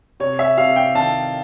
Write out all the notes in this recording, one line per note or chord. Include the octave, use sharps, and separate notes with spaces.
C3 C#5
E5
C3 F5
G5
D#3 A5